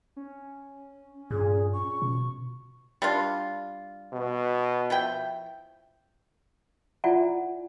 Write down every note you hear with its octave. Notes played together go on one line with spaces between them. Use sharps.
C#4
G2 A#2 G#4
C#6
B2
G3 D4 F4
B2
F3 E4 G5
E4 F4 D5 E5 F#5 G#5